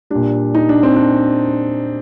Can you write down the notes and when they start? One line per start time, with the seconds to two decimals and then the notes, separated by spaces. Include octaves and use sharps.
0.10 A#2 G3 D4
0.55 D#4
0.69 D4
0.83 C4
0.96 D4